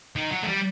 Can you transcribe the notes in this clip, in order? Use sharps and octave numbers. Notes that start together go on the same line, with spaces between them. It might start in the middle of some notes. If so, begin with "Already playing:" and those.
D#3
F#3
A3
G3